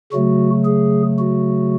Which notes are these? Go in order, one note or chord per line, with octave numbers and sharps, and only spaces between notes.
C#3 F#3 A3 F#4
G#4
F#4